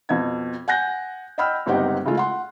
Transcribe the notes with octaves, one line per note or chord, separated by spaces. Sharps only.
F2 B2 G#6
F#5 G#5 F#6 G6 A#6
D#5 F#5 G5 B5 E6 F6
G1 C#2 C4 D#4 G4 F#5
C#3 G#3 A3 F4
F#5 C6